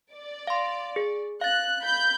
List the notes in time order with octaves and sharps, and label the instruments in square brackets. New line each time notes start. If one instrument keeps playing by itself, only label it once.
[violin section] D5
[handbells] F5 C6
G#4
[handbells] F5 A6 [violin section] F#6
[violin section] B5 G6